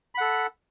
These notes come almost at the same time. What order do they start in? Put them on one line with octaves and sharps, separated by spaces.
B5 F#5 A4